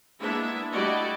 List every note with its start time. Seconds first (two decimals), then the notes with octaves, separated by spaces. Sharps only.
0.20 G#3 A#3 B3 D4 E4 E5
0.72 G3 A3 E4 F#4 D5 D#5